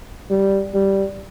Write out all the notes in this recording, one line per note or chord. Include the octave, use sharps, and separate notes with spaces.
G3
G3